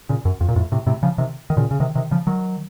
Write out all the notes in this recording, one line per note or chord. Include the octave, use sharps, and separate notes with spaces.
A#2 C#3
F#2
F2
A#2
F2 A2
A2 C3
A2 C3
C#3 F3
C3 D#3
D#3
A#2 C#3
C#3
C3 D#3
C3 D#3
C#3 F3
D#3 F#3